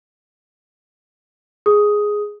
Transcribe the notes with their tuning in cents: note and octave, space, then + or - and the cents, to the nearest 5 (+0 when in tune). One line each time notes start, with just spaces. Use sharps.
G#4 +0 D#6 +5